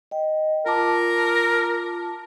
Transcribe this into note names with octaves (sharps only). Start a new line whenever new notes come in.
D#5 G5
F4 A#4 A5 D6